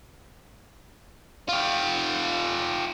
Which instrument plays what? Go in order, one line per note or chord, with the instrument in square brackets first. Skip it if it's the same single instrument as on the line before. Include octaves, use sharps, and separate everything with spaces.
[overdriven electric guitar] F4 G4